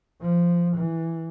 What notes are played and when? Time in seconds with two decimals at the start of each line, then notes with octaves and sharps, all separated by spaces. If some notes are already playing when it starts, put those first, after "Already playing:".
0.22 F3
0.77 E3